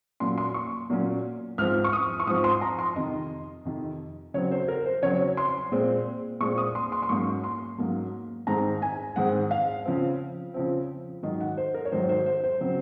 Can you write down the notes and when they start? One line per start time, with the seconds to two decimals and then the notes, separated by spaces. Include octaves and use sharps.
0.20 A#2 F#3 A#3 C#4 C6
0.38 C6
0.54 C#6
0.90 A#2 F#3 A#3 C#4
1.58 G#2 F3 C4 F6
1.84 C#6
1.93 D#6
2.20 C#6
2.27 G#2 F3 C4 D#6
2.44 C6
2.61 A#5
2.79 C6
2.96 F2 C3 D#3 D#5
3.65 F2 C3 D#3
4.34 C#3 F#3 C4 C#5
4.51 C5
4.68 A#4
4.86 C5
5.03 C#3 F#3 C4 C#5
5.37 C6
5.72 A#2 G#3 C4
6.41 A#2 G#3 C4 C#6
6.58 D#6
6.75 C6
6.92 C6
7.02 C6
7.09 G#2 F#3 A#3 C#4 C#6
7.44 C6
7.78 G#2 F#3 A#3 C#4
8.47 G#2 D#3 G#3 C4 A#5
8.82 G#5
9.16 G#2 D#3 G#3 C4 F#5
9.51 F5
9.85 C#3 F3 C4
10.54 C#3 F3 C4
11.23 G#2 D#3 F#3 D#5
11.41 F#5
11.57 C5
11.74 A#4
11.85 C#5
11.92 G#2 D#3 F#3 C5
12.09 C5
12.26 C5
12.44 C5
12.61 C#3 F#3 C4